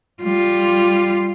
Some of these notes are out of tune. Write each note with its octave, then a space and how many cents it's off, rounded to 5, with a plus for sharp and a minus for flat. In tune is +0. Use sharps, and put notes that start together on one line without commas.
G3 +0 F4 +0